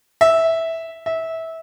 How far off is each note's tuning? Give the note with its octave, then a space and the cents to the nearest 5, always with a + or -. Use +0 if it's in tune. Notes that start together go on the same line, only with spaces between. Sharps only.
E5 -10
E5 -20